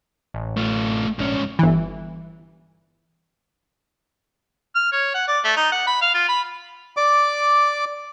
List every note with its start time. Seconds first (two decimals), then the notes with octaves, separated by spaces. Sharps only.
0.34 A1
0.57 A3 F4
1.19 A#1 G#2 C#4
1.59 G1 E3
4.75 F6
4.92 C#5
5.14 F#5
5.28 D5
5.44 A3
5.56 D#4
5.72 F#5
5.87 B5
6.02 F5
6.14 F4
6.29 B5
6.97 D5 D6